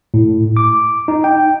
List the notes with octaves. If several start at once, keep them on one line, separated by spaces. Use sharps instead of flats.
A2
D6
D#4
G5